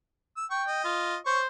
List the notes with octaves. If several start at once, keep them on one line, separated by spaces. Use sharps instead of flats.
E6
G5 C#6
D#5
F4
C5 C#5 C#6